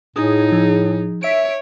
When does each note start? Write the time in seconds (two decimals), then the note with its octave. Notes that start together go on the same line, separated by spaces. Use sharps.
0.16 A2 D#4 G#4
0.52 F3
1.23 C#5 E5 D7